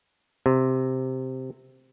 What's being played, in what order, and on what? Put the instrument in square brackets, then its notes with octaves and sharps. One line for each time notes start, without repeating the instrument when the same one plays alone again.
[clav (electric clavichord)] C3